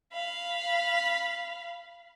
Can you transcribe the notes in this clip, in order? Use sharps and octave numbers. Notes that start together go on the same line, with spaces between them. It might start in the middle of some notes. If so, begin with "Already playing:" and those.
F5 B5